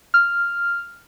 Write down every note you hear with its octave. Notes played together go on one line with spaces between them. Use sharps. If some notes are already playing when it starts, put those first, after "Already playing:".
F6